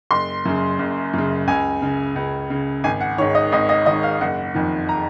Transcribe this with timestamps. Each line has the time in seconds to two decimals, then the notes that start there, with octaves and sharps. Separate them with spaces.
0.11 F#1 C6
0.45 F#2 C#3
0.79 F#1
1.13 F#2 C#3
1.48 C#2 G#5
1.82 C#3
2.16 C#2
2.50 C#3
2.84 G#1 G#5
3.01 F#5
3.18 G#2 D#3 C#5
3.35 D#5
3.52 G#1 D#5
3.69 D#5
3.86 G#2 D#3 D#5
4.03 F5
4.21 F#1 F#5
4.55 F2 D#3
4.89 A#5